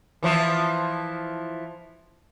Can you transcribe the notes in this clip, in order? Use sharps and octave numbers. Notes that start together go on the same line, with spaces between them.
E3 F3 E4